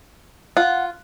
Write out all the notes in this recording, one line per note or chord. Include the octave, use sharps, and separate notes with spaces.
F4 F#5